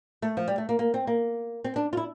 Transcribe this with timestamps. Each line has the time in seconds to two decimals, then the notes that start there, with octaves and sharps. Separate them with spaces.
0.22 A3
0.37 F3
0.48 G3
0.58 A3
0.69 A#3
0.79 A#3
0.94 C4
1.07 A#3
1.64 C4
1.76 D4
1.93 F4
1.97 E4